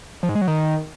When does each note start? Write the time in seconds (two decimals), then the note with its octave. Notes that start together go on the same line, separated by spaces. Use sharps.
0.23 F3
0.29 G#2
0.35 G#3
0.41 F#3
0.48 D#3